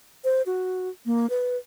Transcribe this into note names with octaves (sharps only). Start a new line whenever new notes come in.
C5
F#4
A#3
B4